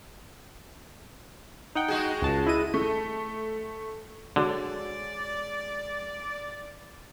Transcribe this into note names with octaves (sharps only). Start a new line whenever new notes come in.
D#4 F#5 G5
G#3 F#4 G#4
C#2 A5
E4 D#5 D#7
A3
D3 G#3 F#4 C#5 D5